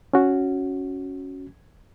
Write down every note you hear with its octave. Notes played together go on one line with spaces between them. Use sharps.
C#4 F#4